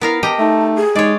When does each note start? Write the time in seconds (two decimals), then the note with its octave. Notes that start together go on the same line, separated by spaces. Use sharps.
0.01 B3 E4 A#4 F5
0.23 G4 D#5 A5 A#5
0.39 A3 D#4
0.76 G#4
0.96 G#3 D#4 C#5 D5